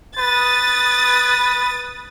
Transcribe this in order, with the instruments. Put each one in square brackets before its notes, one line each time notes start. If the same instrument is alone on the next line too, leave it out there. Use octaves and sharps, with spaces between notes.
[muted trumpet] B4 [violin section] D#6 A6